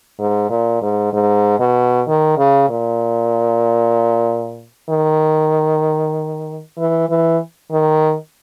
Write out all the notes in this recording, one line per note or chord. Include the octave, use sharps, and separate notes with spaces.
G#2
A#2
G#2
G#2
B2
D#3
C#3
A#2
D#3
E3
E3
D#3